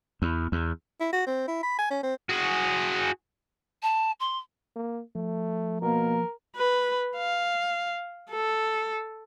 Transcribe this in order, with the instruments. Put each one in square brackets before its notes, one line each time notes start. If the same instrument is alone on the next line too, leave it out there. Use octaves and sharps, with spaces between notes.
[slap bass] E2
E2
[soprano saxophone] E4
F#4
C4
E4
B5
G#5
C#4
C4
[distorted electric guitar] F#4 G#4
[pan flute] A5
C6
[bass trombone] A#3
[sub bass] F3 [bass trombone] A3
[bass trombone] B2 [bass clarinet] A#3 [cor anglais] A#4
[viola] B4
F5
A4